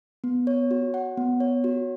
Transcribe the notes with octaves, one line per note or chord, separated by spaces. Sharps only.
B3
C#5
F#4
F#5
B3
C#5
F#4